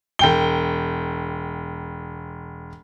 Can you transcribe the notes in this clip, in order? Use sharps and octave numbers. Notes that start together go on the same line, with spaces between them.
E1 G5 G7